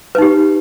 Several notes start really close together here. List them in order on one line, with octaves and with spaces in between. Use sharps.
B4 D#4 G4